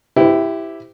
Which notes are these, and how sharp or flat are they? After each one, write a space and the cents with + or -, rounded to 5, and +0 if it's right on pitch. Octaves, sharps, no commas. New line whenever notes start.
E4 +0 G4 +0 C5 -40